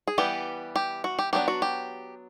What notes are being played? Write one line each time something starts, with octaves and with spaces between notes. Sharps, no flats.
G#4
E3 G3 B3 G4
G4
F#4
G4
F#3 B3 D4 G4
F#4
G4